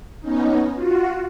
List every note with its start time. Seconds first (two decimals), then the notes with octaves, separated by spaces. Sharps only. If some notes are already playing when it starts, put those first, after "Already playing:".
0.20 B3 C#4 D#4
0.75 F4 F#4